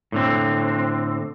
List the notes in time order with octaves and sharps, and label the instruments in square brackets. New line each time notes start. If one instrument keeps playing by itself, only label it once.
[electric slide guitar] A2 D3 C4